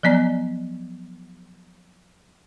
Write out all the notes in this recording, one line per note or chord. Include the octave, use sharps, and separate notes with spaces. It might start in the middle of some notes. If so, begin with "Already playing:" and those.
F3 F#3 B3 D5 A#5